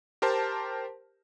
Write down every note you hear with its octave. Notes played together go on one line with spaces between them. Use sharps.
G4 A#4 C5 A5